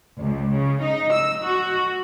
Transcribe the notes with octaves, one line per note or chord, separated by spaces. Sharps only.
C#2
C#3
D#4
E6
F#4